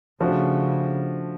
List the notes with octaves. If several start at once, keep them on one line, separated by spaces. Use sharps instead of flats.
C#3 F3 A3 D4 F#4